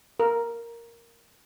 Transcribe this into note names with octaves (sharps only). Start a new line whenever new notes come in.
A#4